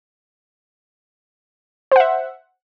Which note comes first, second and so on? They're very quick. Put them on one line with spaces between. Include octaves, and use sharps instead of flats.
C5 F#5 E5